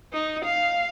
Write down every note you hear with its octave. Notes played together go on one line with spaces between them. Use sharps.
D#4
F5